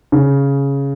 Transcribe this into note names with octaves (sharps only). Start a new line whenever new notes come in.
C#3